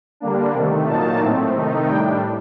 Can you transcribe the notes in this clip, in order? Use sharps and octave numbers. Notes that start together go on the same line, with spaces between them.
D3 G3 A#3 D4
C3 D#3 A3
A#2 F#3 A#3 D#4 A5
A2 A3 C4
C3 D#3 A3 D#4
A2 G3 D4 G5